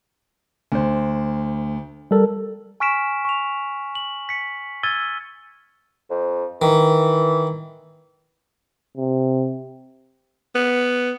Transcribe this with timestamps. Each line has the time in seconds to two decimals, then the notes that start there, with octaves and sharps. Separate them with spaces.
0.72 D2 C5
2.11 G3 A4 A#4
2.80 G#5 C#6 F6 B6 D7 E7
3.25 C#6 F7
3.95 F#7
4.29 B6 C#7
4.83 E6 F6 G#6 A6 D#7 G7
6.10 F2
6.62 D#3 E3
8.97 C3
10.55 B3